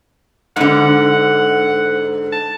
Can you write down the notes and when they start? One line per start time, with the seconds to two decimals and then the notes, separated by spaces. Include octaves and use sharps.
0.56 G#2 D3 F#5
2.32 A5